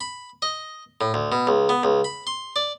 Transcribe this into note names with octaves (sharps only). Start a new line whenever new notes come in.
B5
D#5
A2
D2
B2
C#2
B3
C#2
B5
C6
D5